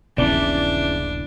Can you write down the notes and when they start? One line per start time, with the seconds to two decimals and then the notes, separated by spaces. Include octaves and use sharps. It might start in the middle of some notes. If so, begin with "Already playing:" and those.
0.18 D#1 A#1 C#3 E3 B3 D4 D5